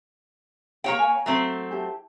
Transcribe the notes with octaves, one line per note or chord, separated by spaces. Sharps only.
A#3 G4 C#5 F5 G5
F5 G#5 A#5
F#3 A3 C4
E4 G4 A5